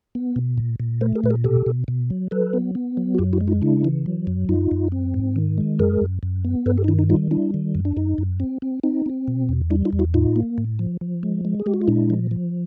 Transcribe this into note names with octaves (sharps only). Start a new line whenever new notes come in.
B3
B2
A#2
A#2
A3 A#4 C5
G#4 A#4
A#2 B4
G#4 A#4
B2 G4 A4
B2
B2
F#3
F#3 A4 B4
B3
B3
F#3
F#4
F#2 F4 G4
E4 F#4
G#3
D#4 F4
C#3 D4 E4
E3
F#3
F#2
F#2 D#4 F4
F#2
C4
G#2
D#3
G#3
F#2 G#4 A#4
F#2
F#2
B3
G2 A4 B4
G4 A4
D#4
D#3 D4 E4
D#4
G3 D#4 F4
G3 D4 E4
D#3
F#2
D4
F#2 D#4
F#2
C4
C4
C4 D#4
C4
B2
E2
G3 D4 E4
D#4 F4
E2
E4 F#4
A2 D#4 F4
A#3
A2
F3
F3
G#3
G#3
G#4
G#3 G4
F#4
F4
A#2 D4 E4
F3
F3